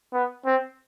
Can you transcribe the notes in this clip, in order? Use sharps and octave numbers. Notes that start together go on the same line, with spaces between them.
B3
C4